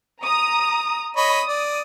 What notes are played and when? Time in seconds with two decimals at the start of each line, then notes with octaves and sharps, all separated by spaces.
0.23 A#5 D#6
1.16 C#5 D#5 B5 D#6
1.48 D5